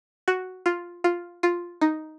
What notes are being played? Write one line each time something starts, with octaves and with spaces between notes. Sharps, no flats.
F#4
F4
F4
F4
D#4